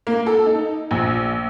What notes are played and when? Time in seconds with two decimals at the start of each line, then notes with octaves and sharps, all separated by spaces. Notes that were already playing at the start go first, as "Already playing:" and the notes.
0.07 A#3
0.26 A4
0.46 D#4
0.91 A#1